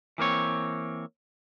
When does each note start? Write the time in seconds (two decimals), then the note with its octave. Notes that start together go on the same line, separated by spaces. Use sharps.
0.18 E3 A#3 C4 C#5